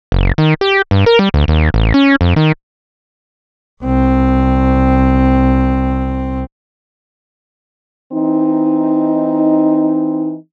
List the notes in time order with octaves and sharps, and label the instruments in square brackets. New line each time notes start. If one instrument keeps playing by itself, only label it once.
[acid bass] F#1
D#3
G4
G2
A#4
G3
D2
D#2
A1
C#4
F2
D#3
[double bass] C2 C4
[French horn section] E3 C4 D#4